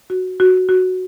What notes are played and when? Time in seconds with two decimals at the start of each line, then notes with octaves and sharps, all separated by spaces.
0.10 F#4
0.40 F#4
0.69 F#4